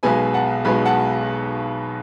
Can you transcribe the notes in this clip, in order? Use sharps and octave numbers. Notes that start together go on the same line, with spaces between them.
B1 B2 G#3 B3 G#5 B5
F#5 A5
B1 B2 G#3 B3 G#5 B5
F#5 A5